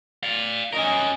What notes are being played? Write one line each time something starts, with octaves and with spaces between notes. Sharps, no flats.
D5 F5
C#4 A#4 D#5 G#5